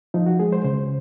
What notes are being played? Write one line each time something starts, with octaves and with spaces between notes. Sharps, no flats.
F3 D#4
F#4
G#3 G#4
C5
C#3 C5